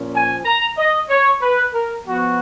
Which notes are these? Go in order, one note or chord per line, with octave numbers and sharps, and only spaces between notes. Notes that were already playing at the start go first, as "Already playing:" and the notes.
Already playing: A#2 F3 A#3 C#4
G#5
A#5
D#5
C#5
B4
A#4
F3 B3 F#4